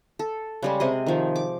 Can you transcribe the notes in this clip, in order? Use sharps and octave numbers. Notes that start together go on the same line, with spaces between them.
A4
C#3 G3 G#3
C3 G#4 D#5
D#3 F3
D6